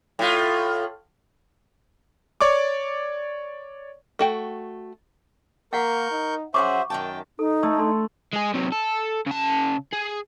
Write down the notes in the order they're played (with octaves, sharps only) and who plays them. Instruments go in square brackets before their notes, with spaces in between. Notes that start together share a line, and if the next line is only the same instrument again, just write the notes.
[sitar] A2 F4
[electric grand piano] C#5 D5 C#6 D6
[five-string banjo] A3 F#4 G5
[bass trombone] A#3 [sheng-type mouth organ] A#4 C#6 G6 [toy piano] F5 F#5
[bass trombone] D#4
[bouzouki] F#3 G#4 F#5 [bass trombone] C#4 [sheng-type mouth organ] C5 E5 [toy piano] C#6 D6
[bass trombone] F#2 [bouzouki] D#3 E5 A5 [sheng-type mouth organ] G5
[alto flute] D#4 [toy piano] A4
[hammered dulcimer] A3 [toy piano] D5
[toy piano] D4 A4 C6
[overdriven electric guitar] G#3 G#4
C3 F#3
A4
C#3 A5
G#4